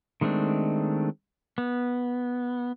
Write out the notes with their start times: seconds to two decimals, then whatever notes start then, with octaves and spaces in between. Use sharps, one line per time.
0.21 D#3 G#3 A3 C4 D4
1.58 B3